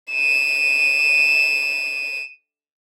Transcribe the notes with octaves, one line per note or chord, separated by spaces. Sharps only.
D#7 E7